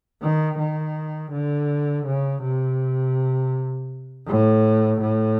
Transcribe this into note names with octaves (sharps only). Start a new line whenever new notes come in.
D#3
D#3
D3
C#3
C3
A2
A2